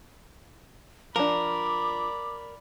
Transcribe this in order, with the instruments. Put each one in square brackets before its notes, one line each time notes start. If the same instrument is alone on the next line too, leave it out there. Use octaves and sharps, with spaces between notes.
[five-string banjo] F3 D4 [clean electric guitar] A#4 [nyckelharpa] D5 B5 [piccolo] D6